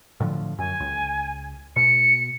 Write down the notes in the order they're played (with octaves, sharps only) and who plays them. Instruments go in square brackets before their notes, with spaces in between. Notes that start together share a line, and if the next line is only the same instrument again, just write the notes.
[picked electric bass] A2 D3 F3
[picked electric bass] F#2 [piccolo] G#5
[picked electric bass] C#2
[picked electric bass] B2 [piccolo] C#7